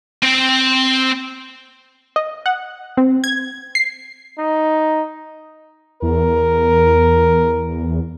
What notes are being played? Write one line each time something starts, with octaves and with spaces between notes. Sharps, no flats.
C4 G5
D#5
F#5
C4
G#6
C7
D#4
E2 A#4